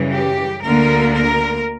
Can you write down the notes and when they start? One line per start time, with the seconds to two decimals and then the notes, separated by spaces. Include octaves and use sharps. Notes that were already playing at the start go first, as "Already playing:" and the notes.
Already playing: F#2 C#3 E3 G3
0.12 G4
0.64 D2 D3 A#3 A#4
1.15 A#4